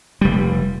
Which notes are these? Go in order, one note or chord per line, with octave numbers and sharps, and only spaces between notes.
F1 G3